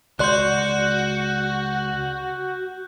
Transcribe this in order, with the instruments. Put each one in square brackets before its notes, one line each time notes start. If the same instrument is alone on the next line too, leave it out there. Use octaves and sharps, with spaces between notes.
[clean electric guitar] C#2 D5 C6 [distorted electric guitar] F#4 [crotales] F#6 G6